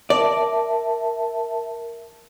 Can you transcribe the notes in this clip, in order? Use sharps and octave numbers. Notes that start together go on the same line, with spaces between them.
A#4 D5 E5 A5